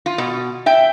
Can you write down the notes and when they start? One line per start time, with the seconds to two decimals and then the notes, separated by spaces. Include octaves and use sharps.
0.06 F4
0.18 B2
0.66 E5 G5